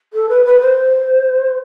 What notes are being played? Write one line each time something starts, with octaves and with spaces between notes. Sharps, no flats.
A4
B4
B4
C5